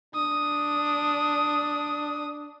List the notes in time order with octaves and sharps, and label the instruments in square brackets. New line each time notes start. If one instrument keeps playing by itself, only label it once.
[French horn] D4 [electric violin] D#6